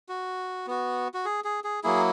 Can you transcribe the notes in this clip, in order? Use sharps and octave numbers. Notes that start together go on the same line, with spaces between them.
F#4
B3 F#4
F#4
G#4
G#4
G#4
F#3 A#3 E4 G#4